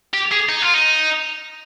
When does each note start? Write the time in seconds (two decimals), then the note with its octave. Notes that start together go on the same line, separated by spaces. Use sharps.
0.14 G4
0.32 G#4
0.49 D#4
0.62 F4
0.74 D#4